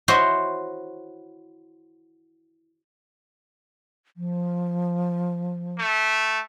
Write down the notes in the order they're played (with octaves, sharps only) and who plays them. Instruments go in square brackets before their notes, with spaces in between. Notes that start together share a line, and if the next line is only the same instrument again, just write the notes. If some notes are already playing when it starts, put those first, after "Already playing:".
[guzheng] E4 F#4 C5 C#5 D#5
[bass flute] F3
[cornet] A3